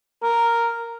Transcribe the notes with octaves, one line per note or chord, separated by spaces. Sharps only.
A#4